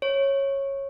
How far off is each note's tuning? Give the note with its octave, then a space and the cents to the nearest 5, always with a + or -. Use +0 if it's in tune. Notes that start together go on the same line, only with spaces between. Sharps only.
C#5 -15